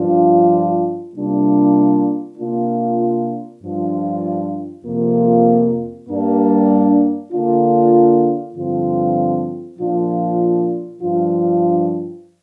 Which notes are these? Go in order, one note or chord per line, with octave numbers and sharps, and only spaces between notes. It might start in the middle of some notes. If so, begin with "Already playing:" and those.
Already playing: G2 F3 D4 F4
C3 G3 A#3 D4 F4
C3 A#3 D4 F4
G2 F3 D4 F4
F2 C3 F3 A#3 F4
G2 G3 A#3 D4
D3 A#3 D4 F4
G2 D3 F3 C4 F4
A#2 F3 D4 F4
G2 F3 D4 F4